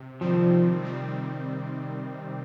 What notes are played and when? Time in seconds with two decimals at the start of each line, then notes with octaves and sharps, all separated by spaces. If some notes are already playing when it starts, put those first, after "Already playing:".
Already playing: C3
0.21 D#3 F3 G3 C4
0.53 C3
0.82 D#3 G3 C4